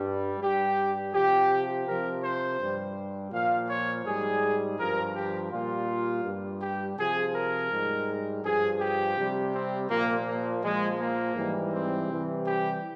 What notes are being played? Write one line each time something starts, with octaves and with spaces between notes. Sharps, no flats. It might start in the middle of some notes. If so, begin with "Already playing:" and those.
Already playing: G2 G3
G2 G3 G4
C3 F3 G4
C3 F3 A#4
C5
G2 G3
A#2 F3 F5
C#5
G#2 G3 G#4
G2 F3 A#4
G4
A#2 G3 F4
G2 G3
G4
C3 F3 G#4
A#4
G#2 G3
G2 F3 G#4
G4
C3 G3
C4
A#2 F3 A#3
A#3
A#2 F3 G#3
A#3
G#2 E3 G3
C4
C3 E3 G3
G4